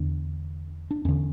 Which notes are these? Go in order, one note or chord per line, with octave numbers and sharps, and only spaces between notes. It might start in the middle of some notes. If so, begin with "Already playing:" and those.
Already playing: E2 D3 D4
D4
E2 D3 C#4